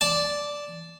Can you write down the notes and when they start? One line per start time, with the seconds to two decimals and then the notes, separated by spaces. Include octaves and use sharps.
0.01 D5 A5